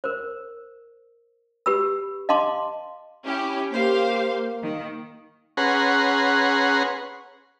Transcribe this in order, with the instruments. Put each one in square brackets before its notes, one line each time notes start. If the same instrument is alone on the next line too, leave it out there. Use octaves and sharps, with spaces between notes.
[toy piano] A#4 C5
G4 B4 B5 E6
D#5 F5 A5 C6 D6
[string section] C#4 E4 G4
[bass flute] A#3 [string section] G4 C5 F5
[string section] D#3
[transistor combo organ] C#4 G#4 B4 F#5 A#5 C6